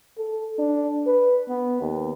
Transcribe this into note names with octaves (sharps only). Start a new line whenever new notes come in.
A4
D4
B4
B3
D#2